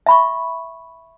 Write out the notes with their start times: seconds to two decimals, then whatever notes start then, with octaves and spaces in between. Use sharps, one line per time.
0.06 E5 B5 C#6